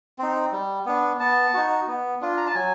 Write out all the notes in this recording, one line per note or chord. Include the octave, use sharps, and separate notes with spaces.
C4 D#4
G3
B3 D4
B3 A5
D#4 F#4
B3
D4 F4
A#5
A5
F#3 G#5